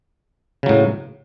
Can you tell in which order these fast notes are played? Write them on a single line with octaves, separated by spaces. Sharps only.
C#3 F#3 A2